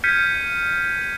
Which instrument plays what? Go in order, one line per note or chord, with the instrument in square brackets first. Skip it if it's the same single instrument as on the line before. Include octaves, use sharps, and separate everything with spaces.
[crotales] F6 G6 G#6 B6 C#7 D#7